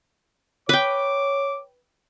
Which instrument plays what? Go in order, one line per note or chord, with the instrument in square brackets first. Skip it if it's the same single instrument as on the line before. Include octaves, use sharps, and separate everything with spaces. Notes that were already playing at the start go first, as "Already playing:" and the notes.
[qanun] B4 G5 [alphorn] C#5 [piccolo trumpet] D6